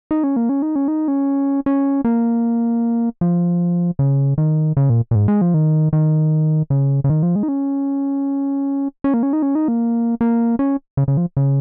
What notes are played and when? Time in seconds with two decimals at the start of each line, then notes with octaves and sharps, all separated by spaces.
0.11 D#4
0.24 C#4
0.36 A#3
0.49 C#4
0.62 D#4
0.76 C#4
0.88 D#4
1.08 C#4
1.66 C#4
2.05 A#3
3.21 F3
3.99 C#3
4.38 D#3
4.77 C#3
4.90 A#2
5.11 A#2
5.15 G#2
5.28 G#3
5.41 F3
5.54 D#3
5.93 D#3
6.70 C#3
7.04 C#3
7.09 D#3
7.23 F3
7.36 G#3
7.43 D#4
7.48 C#4
9.04 C#4
9.14 A#3
9.23 C#4
9.33 D#4
9.42 C#4
9.55 D#4
9.68 A#3
10.21 A#3
10.59 C#4
10.97 C#3
11.08 C#3
11.17 F3
11.37 C#3